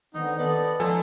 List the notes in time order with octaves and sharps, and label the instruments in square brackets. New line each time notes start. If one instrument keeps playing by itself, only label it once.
[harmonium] D3 B3 C4 [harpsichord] D#3 [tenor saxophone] D#4
[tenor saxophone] B3 [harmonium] A4 D5 D#5 [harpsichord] D6
[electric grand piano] F3 A4 G#5 [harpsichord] C#4 E4 C5 [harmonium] D#4